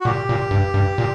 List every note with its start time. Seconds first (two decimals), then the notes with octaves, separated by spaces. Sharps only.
0.01 F#4
0.05 A#2 G4
0.29 A#2
0.51 G2
0.74 G2
0.98 A#2